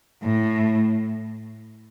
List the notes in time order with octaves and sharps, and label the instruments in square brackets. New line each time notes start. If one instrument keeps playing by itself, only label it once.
[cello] A2